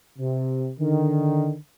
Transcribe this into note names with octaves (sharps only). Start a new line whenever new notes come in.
C3
D3 D#3